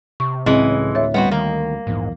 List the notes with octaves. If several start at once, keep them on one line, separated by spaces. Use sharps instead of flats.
C3 C#6
C#2 A2 C#3 E3 F#3 G#3 C4
D2 C#5 E5
G3 B3 C4 F#4
D#3 A#3
A#1 E2 G#2